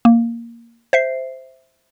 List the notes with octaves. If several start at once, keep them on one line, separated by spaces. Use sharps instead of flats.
A#3
C5 E5 C7